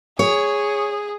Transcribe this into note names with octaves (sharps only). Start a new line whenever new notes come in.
G#4 C#5